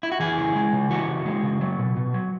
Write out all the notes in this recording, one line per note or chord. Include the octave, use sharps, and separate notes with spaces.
E4
F#4
E3 G#4
C#3
G#3
C#3
E3 F#4
C#3
G#3
C#3
F#3
B2
B2
F#3